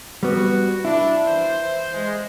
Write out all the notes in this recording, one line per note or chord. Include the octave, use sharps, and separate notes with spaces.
G3 B3 F#4
D4 E4
E3 C5
G#3